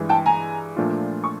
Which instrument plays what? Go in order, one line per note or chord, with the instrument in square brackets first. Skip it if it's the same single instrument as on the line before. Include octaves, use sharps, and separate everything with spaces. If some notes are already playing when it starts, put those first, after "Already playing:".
Already playing: [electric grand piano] G2 E3 G#3
[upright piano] G5 A5
G#5 A#5
[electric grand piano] A#2 F3 A3 D4 F4
[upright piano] C#6